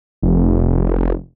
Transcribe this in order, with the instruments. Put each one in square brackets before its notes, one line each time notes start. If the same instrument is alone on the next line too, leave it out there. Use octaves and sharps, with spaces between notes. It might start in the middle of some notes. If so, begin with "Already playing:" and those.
[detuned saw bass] F1